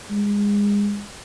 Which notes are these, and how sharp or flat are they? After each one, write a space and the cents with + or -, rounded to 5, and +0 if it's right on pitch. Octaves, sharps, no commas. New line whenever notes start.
G#3 -25